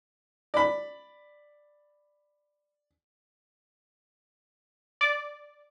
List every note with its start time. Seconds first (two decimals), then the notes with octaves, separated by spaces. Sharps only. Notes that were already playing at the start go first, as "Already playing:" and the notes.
0.54 D5 B5
5.01 D5